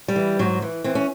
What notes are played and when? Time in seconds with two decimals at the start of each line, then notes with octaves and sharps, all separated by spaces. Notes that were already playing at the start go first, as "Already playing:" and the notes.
0.08 G3
0.16 E3
0.39 G#2 F#3
0.62 E3
0.84 E3 C4
0.95 C#4